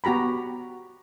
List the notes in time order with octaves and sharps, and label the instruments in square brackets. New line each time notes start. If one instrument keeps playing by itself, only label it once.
[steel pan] B3 F#4 G4 A#5 B5